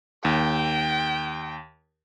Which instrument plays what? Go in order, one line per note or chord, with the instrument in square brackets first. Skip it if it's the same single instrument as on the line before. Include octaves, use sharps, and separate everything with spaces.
[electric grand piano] D#2 [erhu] G5